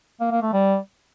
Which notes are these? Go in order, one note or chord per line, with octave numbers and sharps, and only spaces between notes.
A#3
A#3
A3
G3